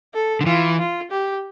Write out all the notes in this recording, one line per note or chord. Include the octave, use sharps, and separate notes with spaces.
A4
D3
E3 F4
F4
G4